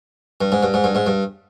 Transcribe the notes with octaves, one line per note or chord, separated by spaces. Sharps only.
G2
G#2
G2
G#2
G2
G#2
G2